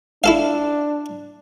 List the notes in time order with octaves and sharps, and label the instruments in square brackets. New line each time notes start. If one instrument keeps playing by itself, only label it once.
[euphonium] D4 [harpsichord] E4 A4 F5